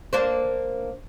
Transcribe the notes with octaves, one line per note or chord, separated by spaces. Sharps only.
A#3 D4 C5